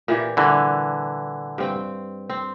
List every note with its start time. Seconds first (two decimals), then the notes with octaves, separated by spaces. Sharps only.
0.08 A#2 E3 G4
0.37 D3 E3 G3
1.58 G2 C4 G5
2.30 C4